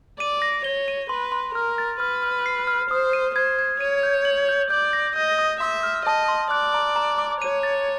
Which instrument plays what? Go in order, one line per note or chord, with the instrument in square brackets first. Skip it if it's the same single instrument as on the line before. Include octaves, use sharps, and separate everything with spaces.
[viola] D5 [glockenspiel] D#7
[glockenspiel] A#6
[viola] C#5 [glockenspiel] G7
[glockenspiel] D#7
[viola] B4 [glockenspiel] C6
[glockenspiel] C6
[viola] A#4 [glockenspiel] F6
[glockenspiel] A6
[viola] B4 [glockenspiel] F6
[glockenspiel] F6
C7
F6
[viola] C5 [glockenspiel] D#6
[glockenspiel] D#7
[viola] C5 [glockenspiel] G#6
[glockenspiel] G#6
[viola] C#5 [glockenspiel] D#7
[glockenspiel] G6
F#7
G6
[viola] D5 [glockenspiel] G6
[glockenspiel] A#6
[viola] D#5 [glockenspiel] G6
[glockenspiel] D#6
[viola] E5 [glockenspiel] C6
[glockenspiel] F6
[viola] D#5 [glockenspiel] A5
[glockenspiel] C6
[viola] D5 [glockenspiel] F#6
[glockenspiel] A#5
A#5
D6
[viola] C#5 [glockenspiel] D#7
[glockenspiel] A6